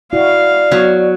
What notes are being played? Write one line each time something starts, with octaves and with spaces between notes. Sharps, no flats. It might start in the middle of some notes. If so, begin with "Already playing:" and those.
E4 F#4 D5 F5
F#3 B3 C#5